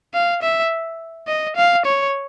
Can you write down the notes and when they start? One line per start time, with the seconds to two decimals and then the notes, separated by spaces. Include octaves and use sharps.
0.14 F5
0.42 E5
1.28 D#5
1.56 F5
1.86 C#5